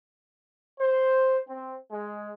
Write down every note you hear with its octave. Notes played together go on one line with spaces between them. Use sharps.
C5
C4
G#3